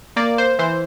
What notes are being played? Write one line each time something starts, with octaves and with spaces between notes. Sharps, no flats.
A#3 D5
C5
E3 C5